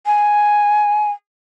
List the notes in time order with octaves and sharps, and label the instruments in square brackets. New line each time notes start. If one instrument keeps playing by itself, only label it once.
[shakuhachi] G#5